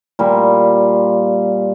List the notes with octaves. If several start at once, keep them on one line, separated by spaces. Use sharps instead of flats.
A#2 G3